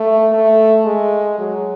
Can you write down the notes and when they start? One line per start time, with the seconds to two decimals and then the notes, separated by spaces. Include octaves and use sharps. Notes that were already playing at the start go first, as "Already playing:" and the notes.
Already playing: A3
0.32 A3
0.85 G#3
1.38 F#3